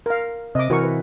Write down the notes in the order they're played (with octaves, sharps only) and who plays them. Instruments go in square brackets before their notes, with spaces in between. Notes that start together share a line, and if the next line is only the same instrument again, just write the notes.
[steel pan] A#4 F5
[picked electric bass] C3 [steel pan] D#5 D6
[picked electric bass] C3 E3 [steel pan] F#4 A#4 C#6
[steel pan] B4